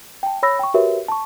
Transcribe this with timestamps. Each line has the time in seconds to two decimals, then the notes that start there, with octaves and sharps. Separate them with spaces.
0.23 G5 A5
0.43 C#5 B5 E6 A#6
0.59 G5 C#6
0.74 F#4 G4 A#4 B4 C#5 E5
1.08 A5 C#6